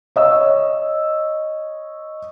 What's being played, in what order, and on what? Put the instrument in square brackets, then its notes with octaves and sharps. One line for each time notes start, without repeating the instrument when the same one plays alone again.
[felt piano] C#5 D#5 E6